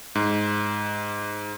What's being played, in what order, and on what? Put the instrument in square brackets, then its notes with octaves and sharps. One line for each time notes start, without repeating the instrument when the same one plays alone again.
[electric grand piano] G#2